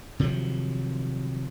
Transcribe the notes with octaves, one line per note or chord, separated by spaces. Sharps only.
C3 D#3 F3 F#3